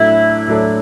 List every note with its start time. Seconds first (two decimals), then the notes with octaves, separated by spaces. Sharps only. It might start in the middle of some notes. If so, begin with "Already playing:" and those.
Already playing: A2 F#3 D4 E4 A4
0.47 A2 F#3 D4 A4